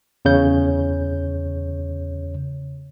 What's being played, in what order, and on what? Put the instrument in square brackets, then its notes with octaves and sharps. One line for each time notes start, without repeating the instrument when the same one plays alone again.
[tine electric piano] E2 C#3 C#5 G6